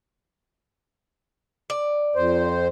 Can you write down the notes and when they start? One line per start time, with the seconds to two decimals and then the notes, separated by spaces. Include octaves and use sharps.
1.70 D5
2.15 F2 C5